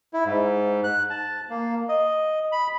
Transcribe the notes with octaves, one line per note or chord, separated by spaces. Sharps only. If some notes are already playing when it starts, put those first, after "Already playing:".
E4
G#2
F#6
A5
A#3
D#5
B5